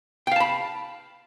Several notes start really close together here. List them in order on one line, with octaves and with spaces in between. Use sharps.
G5 F5 A5 B5